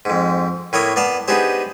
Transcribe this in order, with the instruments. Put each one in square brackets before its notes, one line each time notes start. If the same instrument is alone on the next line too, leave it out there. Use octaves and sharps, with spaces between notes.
[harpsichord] F2 G#2
A2 A#3 C#5 B5 D#6
B3 D5 F5 A5
B3 D4 D#4 G4 G#4 C5